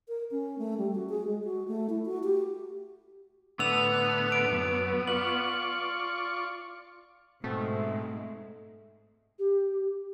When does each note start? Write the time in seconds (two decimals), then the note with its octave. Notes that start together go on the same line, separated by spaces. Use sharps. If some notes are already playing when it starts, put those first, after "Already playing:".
0.08 A#4
0.31 C#4
0.59 A3
0.78 G3
0.95 F#4
1.09 G#4
1.27 G#3
1.44 F#4
1.68 A3
1.90 E4
2.05 F#4
2.24 G4
3.59 A2 D3 B3 E6 F7
4.32 D7
4.51 F#2
5.07 F4 D5 C#6 F#7
7.44 G#2 B2 A3 B3 C4
9.39 G4